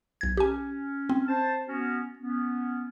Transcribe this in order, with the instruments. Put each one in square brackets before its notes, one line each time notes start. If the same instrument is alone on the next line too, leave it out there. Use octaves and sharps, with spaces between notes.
[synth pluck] B1 G#6
[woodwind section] C#4 [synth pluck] G4 G#5
[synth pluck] C4
[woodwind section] C5 A5
B3 C#4 F#4
B3 C#4